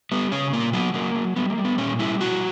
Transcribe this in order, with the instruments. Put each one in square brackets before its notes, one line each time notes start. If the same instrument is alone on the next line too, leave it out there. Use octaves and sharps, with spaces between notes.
[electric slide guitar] G3 B3
C#3 C#4
A#2 A#3
F#3 B3
F#3 A#3
F#3
G3 B3
A#3
G3
B3
A#2 C#4
G3 E4
B2 F#4